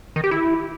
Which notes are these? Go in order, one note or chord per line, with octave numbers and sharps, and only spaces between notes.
D#3
G4
E4